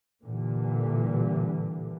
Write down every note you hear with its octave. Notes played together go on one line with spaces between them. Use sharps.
A#2 D3 E3 G3